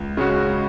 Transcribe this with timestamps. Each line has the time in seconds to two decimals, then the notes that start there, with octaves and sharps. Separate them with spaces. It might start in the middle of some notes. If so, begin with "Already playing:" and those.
Already playing: C#2
0.17 C#3 G#3 C#4 F#4